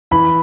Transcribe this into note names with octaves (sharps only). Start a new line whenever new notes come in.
E3 B5